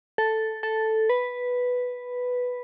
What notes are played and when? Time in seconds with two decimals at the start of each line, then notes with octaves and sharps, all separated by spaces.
0.18 A4
0.63 A4
1.10 B4